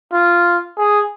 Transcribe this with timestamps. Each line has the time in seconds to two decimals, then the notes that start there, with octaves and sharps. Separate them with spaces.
0.13 F4
0.78 G#4